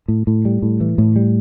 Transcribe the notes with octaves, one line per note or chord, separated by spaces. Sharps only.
A2
A2
G3
A2
E3
A2
G3